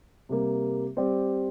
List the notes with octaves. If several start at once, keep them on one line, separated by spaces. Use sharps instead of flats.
C3 G3 A#3
G3 C4 G4 D5